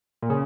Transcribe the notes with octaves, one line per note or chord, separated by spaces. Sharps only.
A#2
C#3